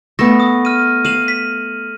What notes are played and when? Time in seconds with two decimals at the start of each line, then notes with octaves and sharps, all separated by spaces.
0.19 A3 B3 A#6
0.40 D#6
0.65 F6 D#7
1.05 F5 D#7 E7 F#7
1.28 B6